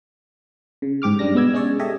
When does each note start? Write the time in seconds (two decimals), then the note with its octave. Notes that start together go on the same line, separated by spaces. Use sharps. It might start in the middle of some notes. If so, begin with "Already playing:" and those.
0.82 C#3
1.02 G#2 G4 D6 F6
1.19 F#2 G3 D4 A#6
1.34 B2 G#3 B3 E6 G#6
1.53 G#3 C#4 G#4 C#5 D5
1.79 G4 A4 C#5 D#5 E5